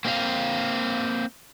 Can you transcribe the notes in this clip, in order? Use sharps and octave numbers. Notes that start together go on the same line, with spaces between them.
A#3 C4 F#4 F5